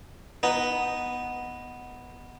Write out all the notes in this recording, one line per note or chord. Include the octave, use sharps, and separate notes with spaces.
B3 D#4